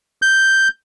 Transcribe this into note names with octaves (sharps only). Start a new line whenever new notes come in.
G6